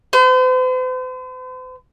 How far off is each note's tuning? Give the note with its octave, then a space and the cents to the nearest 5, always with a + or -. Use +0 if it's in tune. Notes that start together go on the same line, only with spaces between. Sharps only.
C5 -45